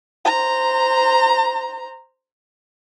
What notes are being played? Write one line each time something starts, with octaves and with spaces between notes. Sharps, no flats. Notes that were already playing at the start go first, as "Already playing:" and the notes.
C5 A#5